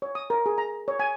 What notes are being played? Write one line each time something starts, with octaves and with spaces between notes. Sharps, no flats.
C#5
D#6
A#4
G#4
A#5
C#5
G#5